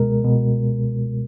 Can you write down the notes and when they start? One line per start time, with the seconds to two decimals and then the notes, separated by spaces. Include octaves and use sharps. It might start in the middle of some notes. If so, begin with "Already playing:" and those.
Already playing: C#2 B2 G#3 A#4
0.25 B2